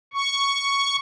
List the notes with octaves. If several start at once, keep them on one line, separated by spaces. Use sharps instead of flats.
C#6